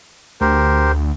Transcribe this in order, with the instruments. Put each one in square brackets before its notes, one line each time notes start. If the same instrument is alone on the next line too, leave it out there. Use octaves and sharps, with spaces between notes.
[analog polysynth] D2 [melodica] G4 A#4 C5